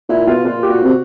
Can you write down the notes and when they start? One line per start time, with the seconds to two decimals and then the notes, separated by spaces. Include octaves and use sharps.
0.09 A#2 E4
0.27 B2 F4
0.45 A#2 F4
0.63 G4
0.68 A#2 F#4
0.83 C3